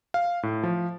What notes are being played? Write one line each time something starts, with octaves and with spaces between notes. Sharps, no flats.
F5
A2
F3